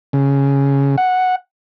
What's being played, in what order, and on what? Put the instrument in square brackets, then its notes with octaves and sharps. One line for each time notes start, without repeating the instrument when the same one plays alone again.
[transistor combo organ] C#3
F#5